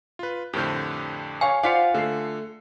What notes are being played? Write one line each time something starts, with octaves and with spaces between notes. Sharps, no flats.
F4 B4
F2 A2 D3 G4 A#4 C5
C#5 F5 G#5 C#6
F4 C5 D5 F5 F#5 D6 B6 C#7
D3 A3 C7